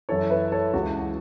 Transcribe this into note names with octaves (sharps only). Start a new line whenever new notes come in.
F#2 E3 A4 C#5
B4 E5
A4 C#5
C#2 C#3 E3 F#4